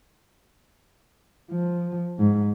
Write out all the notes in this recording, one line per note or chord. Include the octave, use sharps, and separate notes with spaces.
F3
G#2